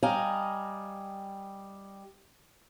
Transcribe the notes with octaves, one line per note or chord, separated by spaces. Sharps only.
G3 D#5 F5 G#5 A#5